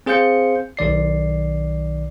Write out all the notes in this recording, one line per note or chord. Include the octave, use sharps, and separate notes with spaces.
C4 G#4 C5 F5 G6 C#7
B1 D#3 D5 C7